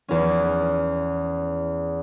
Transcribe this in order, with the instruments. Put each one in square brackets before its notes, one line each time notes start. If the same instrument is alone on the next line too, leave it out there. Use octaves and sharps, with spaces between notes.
[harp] E2 C#4